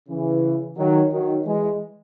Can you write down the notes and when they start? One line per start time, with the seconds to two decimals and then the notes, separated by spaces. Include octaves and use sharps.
0.09 C#3 E3
0.77 D#3 F#3
1.12 D#3 F#3
1.45 E3 G#3